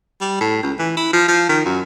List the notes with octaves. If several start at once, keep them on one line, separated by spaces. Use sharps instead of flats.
G3
A2
C#2
E3
E4
F3
F3
D#3
F#2